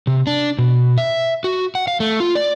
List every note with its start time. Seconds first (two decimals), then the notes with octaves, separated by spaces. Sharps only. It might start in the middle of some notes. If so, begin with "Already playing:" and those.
0.07 C3
0.27 D4
0.58 B2
0.98 E5
1.44 F#4
1.75 F#5
1.88 F5
2.00 A3
2.20 F4
2.35 D5